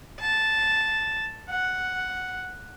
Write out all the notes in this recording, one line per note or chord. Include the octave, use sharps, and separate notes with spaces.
A5
F#5